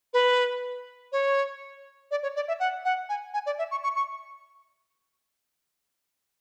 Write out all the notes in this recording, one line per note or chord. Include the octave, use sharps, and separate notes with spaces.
B4
C#5
D5
C#5
D5
E5
F#5
F#5
G#5
G#5
D5
E5
C#6
C#6
C#6